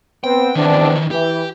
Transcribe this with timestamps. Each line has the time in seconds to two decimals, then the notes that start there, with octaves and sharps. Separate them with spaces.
0.24 B3 C4 C5 G5
0.55 E2 D#3 E3 C4 D4
1.11 E3 G4